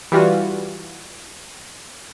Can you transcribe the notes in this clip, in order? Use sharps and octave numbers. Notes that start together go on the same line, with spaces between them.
E3 G3 F4 F#4